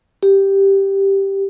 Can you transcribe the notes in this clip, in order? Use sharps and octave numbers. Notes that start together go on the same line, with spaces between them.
G4